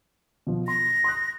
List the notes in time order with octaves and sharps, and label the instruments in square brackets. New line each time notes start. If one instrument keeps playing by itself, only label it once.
[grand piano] B2 F3
[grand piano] C6 [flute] A#6
[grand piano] C6 D#6 F#6